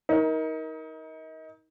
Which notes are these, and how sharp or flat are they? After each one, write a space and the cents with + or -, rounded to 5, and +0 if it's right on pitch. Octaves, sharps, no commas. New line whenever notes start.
D#4 +30 A#4 +15